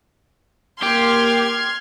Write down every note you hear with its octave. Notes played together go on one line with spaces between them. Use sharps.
A#3 G4 C6 F6 G#6